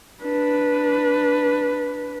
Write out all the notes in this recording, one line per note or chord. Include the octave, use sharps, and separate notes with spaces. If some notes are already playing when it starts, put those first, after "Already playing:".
D4 B4